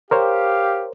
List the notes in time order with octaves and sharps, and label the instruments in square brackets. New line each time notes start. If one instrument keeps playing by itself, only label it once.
[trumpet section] G4 F5 [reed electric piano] A#4 C5 C#5